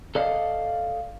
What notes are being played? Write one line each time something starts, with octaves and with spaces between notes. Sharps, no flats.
A4 D5 D#5 F5